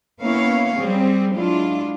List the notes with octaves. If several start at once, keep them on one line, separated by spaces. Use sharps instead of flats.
A#3 B3 C#4 E4 C#5 F5
G3 C4 G#4
F#3 G#3 D4 E4 F4